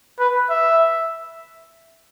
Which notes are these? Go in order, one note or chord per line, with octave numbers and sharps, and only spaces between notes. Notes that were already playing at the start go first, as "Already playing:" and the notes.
B4
E5